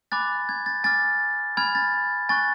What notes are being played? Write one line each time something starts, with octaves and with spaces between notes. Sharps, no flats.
G#5 B5 D6 F#6 A6
G#6
A6
G#5 D6 F6 A6
G#5 B5 F6 G#6
A6
G#5 C#6 F#6 A6